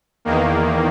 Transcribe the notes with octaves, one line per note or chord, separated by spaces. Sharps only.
E2 D#3 A#3